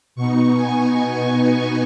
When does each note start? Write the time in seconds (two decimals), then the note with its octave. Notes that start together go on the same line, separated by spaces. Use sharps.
0.16 B2 B3 D#4 C#6
0.56 G#5